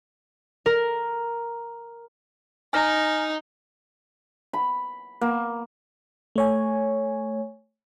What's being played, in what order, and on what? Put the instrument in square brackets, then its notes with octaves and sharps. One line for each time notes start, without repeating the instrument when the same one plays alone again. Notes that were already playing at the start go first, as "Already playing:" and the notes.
[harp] A#4
[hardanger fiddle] D#4 [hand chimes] G#5 F6 A#6
[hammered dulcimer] B5
A#3
[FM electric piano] A3 C#5 G#5